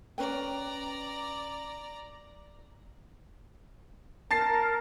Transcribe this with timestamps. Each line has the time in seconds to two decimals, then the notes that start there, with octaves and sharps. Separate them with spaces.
0.18 C#4 B4 D5 G5 A#5
4.31 A#4 A5 A6 C7